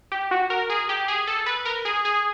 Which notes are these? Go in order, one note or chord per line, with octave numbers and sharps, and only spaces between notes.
G4
F#4
A#4
G#4
G4
G#4
A4
B4
A#4
G#4
G#4